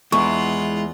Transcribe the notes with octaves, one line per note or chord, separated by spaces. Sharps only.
E2 G#3 E4 F4 F#5 C#6